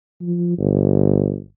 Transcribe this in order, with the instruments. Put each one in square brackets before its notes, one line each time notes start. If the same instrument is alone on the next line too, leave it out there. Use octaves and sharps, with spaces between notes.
[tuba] F3
G1